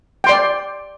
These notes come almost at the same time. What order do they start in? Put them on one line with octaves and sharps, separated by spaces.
G5 C6 D5